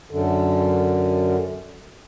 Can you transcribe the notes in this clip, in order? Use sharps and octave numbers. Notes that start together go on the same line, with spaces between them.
F#2 D3